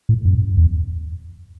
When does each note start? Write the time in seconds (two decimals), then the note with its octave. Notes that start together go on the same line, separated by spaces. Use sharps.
0.09 A2
0.25 F#2
0.57 E2